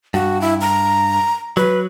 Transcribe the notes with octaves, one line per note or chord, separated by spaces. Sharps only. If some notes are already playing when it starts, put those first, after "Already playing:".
G2 F#4
E4
A#5
F#3 B4